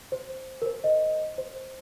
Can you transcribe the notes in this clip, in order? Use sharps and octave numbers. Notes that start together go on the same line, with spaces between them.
C5
A#4
C5
D#5
C5